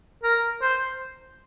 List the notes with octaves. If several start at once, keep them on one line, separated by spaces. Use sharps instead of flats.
A#4
C5